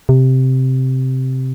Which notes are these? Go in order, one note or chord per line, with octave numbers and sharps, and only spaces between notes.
C3